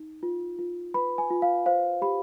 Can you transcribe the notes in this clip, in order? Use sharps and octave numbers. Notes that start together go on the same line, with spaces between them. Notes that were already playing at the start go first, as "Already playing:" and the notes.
Already playing: D#4
F4
F4
B4 B5
G#5
F4
F5
C5 F5
G4 B5